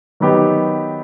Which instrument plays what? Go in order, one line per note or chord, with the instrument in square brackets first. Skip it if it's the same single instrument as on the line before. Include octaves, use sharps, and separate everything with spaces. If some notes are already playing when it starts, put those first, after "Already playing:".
[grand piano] D#3 F#3 B3 D#4 G4